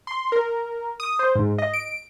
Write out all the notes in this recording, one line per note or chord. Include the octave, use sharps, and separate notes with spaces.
C6
A#4
D#6
C5
G#2
D#5
D7